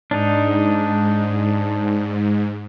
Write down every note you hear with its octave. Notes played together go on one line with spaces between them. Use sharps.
G#2 D4 D#4